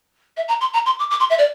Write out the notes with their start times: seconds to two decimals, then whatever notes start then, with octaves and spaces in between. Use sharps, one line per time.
0.37 E5
0.48 A#5
0.61 C6
0.73 A#5
0.86 C6
0.99 D6
1.10 D6
1.20 C6
1.30 E5
1.38 D5